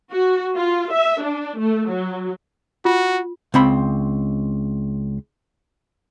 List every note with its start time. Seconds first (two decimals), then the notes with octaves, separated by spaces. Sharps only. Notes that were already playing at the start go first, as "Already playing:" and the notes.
0.12 F#4
0.56 F4
0.93 E5
1.24 D4
1.59 A3
1.89 F#3
2.85 F4 F#4
3.54 C#2 C4 B5